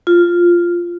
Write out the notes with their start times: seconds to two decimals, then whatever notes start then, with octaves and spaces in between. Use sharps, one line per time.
0.07 F4